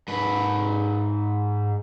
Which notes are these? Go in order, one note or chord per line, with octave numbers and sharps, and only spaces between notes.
G#2 B4